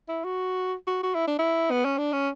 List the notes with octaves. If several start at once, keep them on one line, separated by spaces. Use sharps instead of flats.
E4
F#4
F#4
F#4
E4
D4
E4
B3
C#4
D4
C#4